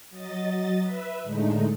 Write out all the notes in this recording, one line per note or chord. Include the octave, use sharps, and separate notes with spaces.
F#3 D#5 A6
B4 E5
A2 D3 G#3 A3 D#4